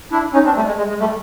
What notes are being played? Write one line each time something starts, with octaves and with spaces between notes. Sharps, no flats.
D4 E4
C#4 D#4
C4 D4
G3 A3
G#3
G#3
G#3
G3 A3